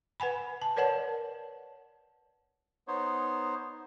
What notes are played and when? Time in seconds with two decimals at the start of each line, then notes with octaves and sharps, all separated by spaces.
0.20 B4 F#5 G#5 B5
0.62 A5
0.76 A#4 B4 C#5 D5 F#5 A5
2.88 B3 D#4 C5 C#5